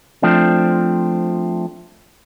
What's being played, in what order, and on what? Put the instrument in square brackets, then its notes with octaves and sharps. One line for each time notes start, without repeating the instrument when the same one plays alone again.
[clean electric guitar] F3 A3 C4 D4